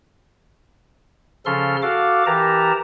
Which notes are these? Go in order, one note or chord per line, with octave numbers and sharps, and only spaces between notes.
C#3 F3 C#4 A4 C6 F6
F#4 A4 F5 D6
E3 G4 A#4 A5 A#5